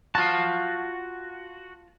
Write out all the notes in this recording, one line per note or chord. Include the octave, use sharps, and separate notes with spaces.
F4 F#4 A5